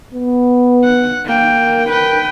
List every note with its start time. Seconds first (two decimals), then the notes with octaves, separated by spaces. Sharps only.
0.14 B3
0.84 F#5
1.26 A#3 G5
1.55 A#4
1.90 B4 G5